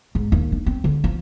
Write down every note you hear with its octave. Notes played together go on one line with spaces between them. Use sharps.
G#2
D#2
D4
C4
D3
F3